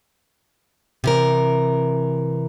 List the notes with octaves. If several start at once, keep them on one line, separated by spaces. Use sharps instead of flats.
C3 E3 A#4